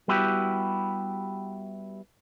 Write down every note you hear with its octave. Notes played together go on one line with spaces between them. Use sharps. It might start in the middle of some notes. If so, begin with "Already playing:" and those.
G3 B3 E4 F#4 G4